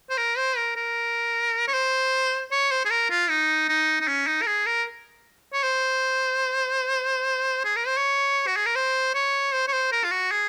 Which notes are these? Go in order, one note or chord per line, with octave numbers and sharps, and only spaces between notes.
C5
A#4
C5
A#4
A#4
C#5
C5
C#5
C5
G#4
A#4
F4
D#4
D#4
D#4
C#4
D#4
A#4
G#4
A#4
C#5
C5
G#4
A#4
C5
C#5
F#4
G#4
A#4
C5
C#5
C5
C#5
C5
A#4
F4
F#4
G#4